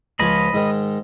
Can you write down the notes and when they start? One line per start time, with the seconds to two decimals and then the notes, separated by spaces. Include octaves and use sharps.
0.19 C#2 F3 C#5 D#5 B5
0.53 G#2 D#3